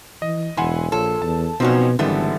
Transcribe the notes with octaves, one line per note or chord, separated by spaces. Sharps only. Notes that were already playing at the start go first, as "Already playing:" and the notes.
E3 D#5
E1 E3 F#5 G#5 C6
A#1 F4 A4 C#5
E2 A5
B2 F3 F#3 C4 C#4 D#4 F#4
G#1 G#2 D3 E3 G3 A3 B3